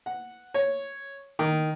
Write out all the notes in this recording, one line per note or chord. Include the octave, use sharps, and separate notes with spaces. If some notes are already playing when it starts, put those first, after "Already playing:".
F#5
C#5
D#3